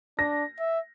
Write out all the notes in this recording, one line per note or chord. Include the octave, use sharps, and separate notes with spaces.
D4 A#6
E5